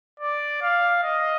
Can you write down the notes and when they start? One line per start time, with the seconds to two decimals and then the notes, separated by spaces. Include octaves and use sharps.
0.20 D5
0.62 F5
1.03 D#5